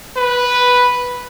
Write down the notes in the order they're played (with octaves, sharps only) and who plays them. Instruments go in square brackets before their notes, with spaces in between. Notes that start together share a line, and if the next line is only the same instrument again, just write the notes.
[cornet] B4